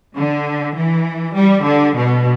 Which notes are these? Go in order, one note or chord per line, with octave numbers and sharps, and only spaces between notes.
D3
E3
G3
D3
B2